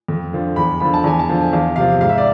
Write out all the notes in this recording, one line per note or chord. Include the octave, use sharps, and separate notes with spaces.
F2
D3 F3
E2 B5
D3 F3 B5
A5
E2 G#5
A5
D3 F3
G#5
E2 F5
C3 F3 F5
G#2 F5
E5
D5